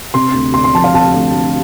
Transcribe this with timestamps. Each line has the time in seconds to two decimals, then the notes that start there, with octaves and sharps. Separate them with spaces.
0.14 C3 C6
0.34 D2
0.54 D2 C6
0.64 C6
0.74 F3 A5
0.84 F5
0.94 C3 A5
1.14 D2
1.33 D2